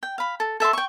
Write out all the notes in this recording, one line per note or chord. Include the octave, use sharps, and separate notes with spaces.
G5
F5 B5
A4
A4 E5 A5 C6
G5 C#6